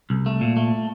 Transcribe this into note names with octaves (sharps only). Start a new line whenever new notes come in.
C2
A3
A#2
A3